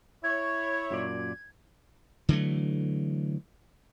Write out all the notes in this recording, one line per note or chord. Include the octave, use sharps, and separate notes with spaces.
E4 C#5 G#6
F#2 A#2 D5
D3 E3 F#3 A3